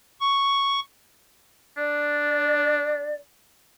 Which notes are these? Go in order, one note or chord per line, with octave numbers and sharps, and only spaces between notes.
C#6
D4 D5